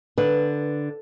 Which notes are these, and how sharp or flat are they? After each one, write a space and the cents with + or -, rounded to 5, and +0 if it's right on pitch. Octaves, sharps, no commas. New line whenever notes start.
D3 +0 B4 -5